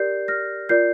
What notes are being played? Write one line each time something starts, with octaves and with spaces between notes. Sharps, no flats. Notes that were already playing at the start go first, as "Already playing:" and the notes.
Already playing: G4 A#4 D5 G6 C7
F6 A#6
F4 A#4 D5 G6 C7